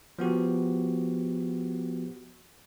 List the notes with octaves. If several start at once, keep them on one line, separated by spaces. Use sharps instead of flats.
F3 B3 F#4 G4